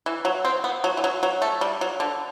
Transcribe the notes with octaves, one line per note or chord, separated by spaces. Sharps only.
E3
F#3
C4
B3
F#3
E3
F#3
F#3
A3
G3
F#3
D3